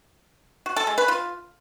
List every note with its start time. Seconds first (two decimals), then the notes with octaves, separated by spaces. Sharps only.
0.66 F#4
0.76 A4
0.87 G#3
0.98 B4
1.08 F4